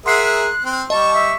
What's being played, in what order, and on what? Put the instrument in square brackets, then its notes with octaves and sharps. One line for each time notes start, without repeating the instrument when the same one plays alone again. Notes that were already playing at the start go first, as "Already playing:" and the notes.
[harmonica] G#4 A#4 E5 [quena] F#5 [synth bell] C6 C7
[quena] F#6
[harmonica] C4
[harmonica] G3 C#6 [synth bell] D#5 [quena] A5
[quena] E5